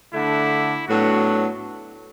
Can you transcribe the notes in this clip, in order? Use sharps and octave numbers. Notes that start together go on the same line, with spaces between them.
D3 A3 D4 E4
A2 F#3 B3 D4 F#4